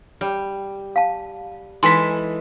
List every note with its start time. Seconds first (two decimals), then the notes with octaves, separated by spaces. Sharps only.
0.21 G3
0.96 F5 A5
1.83 E3 G#3 D#4 A4 C6 B6